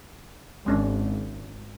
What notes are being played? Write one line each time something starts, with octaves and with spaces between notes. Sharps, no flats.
G#1 G#3 C#4 D4